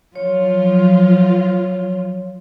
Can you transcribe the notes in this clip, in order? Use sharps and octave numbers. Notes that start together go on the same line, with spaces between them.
F3 F#3 F4 C#5